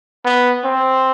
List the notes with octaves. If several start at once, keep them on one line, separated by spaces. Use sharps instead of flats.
B3
C4